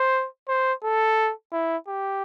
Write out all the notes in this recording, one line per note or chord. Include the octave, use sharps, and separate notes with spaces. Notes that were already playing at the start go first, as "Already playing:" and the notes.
Already playing: C5
C5
A4
E4
G4